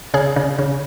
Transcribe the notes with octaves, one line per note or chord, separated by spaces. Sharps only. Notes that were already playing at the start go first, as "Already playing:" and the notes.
C#3 G#4
C#3
C#3